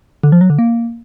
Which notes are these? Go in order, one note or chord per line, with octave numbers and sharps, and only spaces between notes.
D3
F3
F#3
D3
A#3